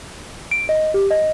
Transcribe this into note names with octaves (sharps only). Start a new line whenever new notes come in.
D7
D#5
G4
D#5